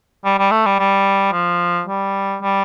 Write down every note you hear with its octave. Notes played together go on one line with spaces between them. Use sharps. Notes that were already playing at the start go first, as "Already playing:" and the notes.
G3
G3
A3
G3
G3
F3
G3
G3